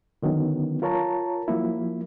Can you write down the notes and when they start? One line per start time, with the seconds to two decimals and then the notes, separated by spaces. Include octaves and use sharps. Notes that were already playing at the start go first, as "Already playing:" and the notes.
0.23 D3 D#3 F#3 B3 C#4
0.82 F4 A#4 C#5 A5 A#5
1.48 F3 F#3 A#3 E4